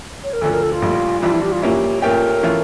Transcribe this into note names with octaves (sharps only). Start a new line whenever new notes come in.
C#5
A#4
D2 D3 F3 A4
A#4
A4
F4
A#1 A2 G3
F2 E3 G3 D4 F4
E4
G4
F4
A#2 F3 A#3 C#4 E4 G4
A#2 A3 C#4 G4 A#4
E3 A3 C#4 F4